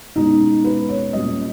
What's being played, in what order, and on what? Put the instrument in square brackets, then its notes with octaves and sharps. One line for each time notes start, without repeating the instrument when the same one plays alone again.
[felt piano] B2 G#3 C#4 D#4
B4
C#5
A#2 G3 C#4 D#5